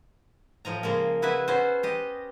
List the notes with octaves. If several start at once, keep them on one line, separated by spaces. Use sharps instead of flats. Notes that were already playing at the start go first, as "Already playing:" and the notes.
A2 F3 D#5 A#5
C#3 G#3 A#3 A#4
E4 F#4 G#4 B4 E5
B3 C#4 F#4 C5
G4 D#5